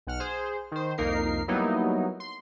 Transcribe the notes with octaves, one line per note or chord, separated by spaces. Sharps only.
B1 F#5 F6
G#4 C5
D#3 C5
C2 F2 A#3 D#4 A#4 C7
F#3 G3 A#3 B3 D#4 E4
C6